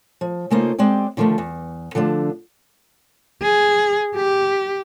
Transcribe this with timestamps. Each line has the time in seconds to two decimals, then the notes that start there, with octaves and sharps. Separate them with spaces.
0.21 F3
0.50 C#3 A3 A#3 D#4 F4 C5
0.78 G#3 C4 G4 D5
1.17 D3 D#3 F3 F#3 A3
1.38 E2
1.95 D3 F3 A3 D4
3.42 G#4
4.16 G4